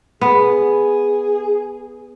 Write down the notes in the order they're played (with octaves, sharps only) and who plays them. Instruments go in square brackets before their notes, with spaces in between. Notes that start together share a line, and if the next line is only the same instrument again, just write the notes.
[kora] B3 [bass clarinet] G#4